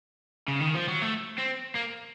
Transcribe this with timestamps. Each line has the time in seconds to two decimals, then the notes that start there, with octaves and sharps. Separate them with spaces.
0.48 C#3
0.60 D#3
0.75 F3
0.88 F#3
1.02 A3
1.38 C4
1.75 A#3